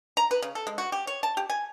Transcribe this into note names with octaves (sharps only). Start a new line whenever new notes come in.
A#5
B4
C#3
A4
G#3
F#4
G4
C#5
A5
G4
G#5